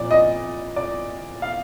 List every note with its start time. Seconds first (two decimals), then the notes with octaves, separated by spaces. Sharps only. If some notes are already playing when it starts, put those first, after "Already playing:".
Already playing: A#2 F3 D5
0.11 D#5
0.76 D5
1.42 F5